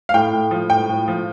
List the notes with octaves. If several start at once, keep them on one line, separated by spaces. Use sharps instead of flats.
F5
A2 G5
A2
F3
A2 G5
A2
F3